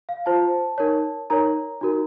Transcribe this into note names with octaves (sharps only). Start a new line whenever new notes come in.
F5
F4 C5 A5
D#4 A#4 C#5
D#4 A#4 C#5 A#5
D#4 F#4 A#4